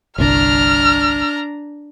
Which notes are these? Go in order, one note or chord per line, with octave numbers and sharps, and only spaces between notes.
G1 C2 D4 A#5 F6